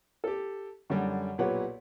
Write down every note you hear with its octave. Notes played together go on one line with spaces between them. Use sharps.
G4 A4
F#2 D3 G3
B1 A#2 G4 B4 C#5 F#5